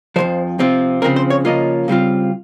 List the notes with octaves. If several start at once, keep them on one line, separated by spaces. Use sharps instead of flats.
F2 C#3 F3 C5
C3 F3 C4 F4
C#3 F3 C4 A#4
C5
C#5
C#3 F3 A#3 C#4 F4 D#5
C#3 G3 C4 F4